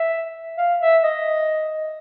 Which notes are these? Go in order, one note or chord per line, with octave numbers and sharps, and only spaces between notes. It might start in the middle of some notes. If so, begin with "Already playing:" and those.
Already playing: E5
F5
E5
D#5